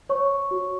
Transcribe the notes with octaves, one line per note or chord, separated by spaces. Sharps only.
C5 C#5 C#6
F#4